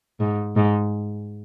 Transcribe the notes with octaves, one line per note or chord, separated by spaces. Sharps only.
G#2
G#2